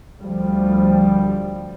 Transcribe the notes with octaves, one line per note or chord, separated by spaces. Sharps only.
D2 F3 G3